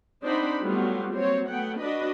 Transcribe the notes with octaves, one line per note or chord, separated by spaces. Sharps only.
C4 D4 D#4 C5 F#5 B5
F#3 G3 A3 B3 F4 F#4
F#3 A#3 C4 C5 C#5
A3 B3 F#5 G5
D4 F#4 B4 D#5 B5